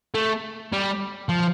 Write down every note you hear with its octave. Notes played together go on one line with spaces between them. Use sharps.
A3
G3
F3